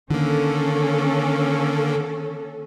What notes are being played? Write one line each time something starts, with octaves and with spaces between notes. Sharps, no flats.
D3 D#3 A#3 C#4 A4